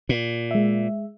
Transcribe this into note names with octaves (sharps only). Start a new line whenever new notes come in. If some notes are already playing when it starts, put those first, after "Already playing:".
A#2
G#3 E5